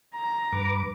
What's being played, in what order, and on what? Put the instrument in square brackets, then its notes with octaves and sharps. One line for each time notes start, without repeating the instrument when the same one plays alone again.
[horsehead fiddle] A#5
[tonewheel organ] G2 B4 D6